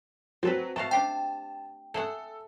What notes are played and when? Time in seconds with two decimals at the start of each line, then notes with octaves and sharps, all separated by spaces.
0.43 F#3 C4 A4 B4
0.76 A3 F#4 F5 A5
0.91 D4 G4 C5 G5
1.94 A3 G#4 A4 F#5